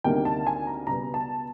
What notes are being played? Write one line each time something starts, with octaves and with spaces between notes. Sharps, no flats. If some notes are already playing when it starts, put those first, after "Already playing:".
D2 C3 D#3 G3 A#3 G5
A5
G#5
A#5
C#2 B2 G3 B3 A#5
A5